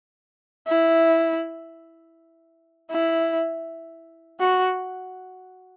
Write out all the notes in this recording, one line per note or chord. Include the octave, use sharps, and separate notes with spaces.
E4
E4
F#4